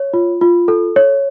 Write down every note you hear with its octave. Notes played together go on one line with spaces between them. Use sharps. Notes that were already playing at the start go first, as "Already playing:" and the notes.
Already playing: C#5
F4
F4
A4
C#5